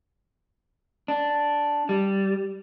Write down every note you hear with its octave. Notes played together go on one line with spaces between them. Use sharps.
D4
G3